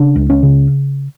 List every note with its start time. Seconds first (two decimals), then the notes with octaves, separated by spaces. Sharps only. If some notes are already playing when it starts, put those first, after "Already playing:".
Already playing: C#3 D4
0.16 C#2
0.30 C#4
0.43 C#3